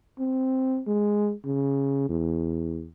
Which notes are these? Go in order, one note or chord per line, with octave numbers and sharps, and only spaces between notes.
C4
G#3
C#3
E2